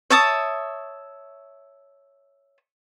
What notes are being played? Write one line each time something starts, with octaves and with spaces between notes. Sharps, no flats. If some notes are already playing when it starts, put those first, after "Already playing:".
C#5 E5 A5 D#6